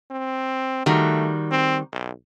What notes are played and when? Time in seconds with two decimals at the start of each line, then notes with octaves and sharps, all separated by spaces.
0.11 C4
0.86 D#3 G3 A3 F#4
1.51 C4
1.92 B1